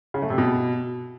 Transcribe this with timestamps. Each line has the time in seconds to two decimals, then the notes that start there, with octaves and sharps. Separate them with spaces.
0.14 C#3
0.22 A3
0.30 C3
0.38 B2